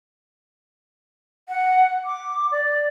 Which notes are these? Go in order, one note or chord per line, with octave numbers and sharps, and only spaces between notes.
F#5
D6
D5